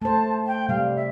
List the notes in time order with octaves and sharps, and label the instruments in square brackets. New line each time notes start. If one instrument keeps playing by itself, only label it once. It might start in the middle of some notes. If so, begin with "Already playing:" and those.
[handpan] A3 C5 [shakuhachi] A5
[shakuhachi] G5
[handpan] C3 G3 [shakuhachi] F5
[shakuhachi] E5